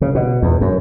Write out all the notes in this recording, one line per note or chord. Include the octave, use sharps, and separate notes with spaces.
C#3
B2
E2
F#2